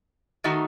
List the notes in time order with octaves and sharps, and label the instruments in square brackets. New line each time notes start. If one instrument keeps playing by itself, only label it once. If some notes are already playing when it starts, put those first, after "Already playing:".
[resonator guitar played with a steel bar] D#3 A3 D#4 F#4